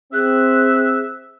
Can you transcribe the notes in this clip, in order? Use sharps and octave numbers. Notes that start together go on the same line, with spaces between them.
C4 G#4 E5 F#6